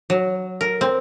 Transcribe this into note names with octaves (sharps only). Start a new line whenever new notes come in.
F#3
A#4
C4